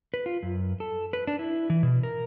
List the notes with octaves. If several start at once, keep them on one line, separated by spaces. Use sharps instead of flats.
B4
F4
F#2
A4
B4
D4
E4
E3
B2
A#4